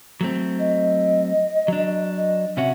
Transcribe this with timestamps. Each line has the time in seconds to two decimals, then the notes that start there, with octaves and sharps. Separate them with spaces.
0.21 F#3 A3 C4
0.59 D#5
1.68 F#3 D4
2.17 D#5
2.57 C3 C#4 F#4 E5